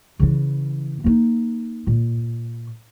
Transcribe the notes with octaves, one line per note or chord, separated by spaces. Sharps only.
C#3 E3
A#3 D#4
A#2